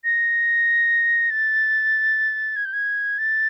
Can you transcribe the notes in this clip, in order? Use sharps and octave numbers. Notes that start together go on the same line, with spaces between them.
A#6
A6
G#6
G6
G#6
A6